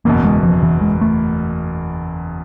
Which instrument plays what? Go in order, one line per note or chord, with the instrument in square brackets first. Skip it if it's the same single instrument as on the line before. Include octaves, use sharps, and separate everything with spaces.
[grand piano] F#1 E2 B2 [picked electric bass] A#3
[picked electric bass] G#3
F3
E3
G#3
A3